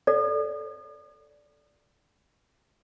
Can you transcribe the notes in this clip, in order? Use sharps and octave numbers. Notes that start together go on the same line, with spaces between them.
A4 D5